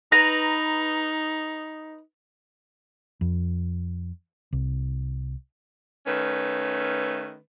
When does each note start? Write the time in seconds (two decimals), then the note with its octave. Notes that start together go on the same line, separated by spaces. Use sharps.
0.12 D#4 B4 A#5
3.21 F2
4.53 C2
6.06 D#3 A3 C#4 B4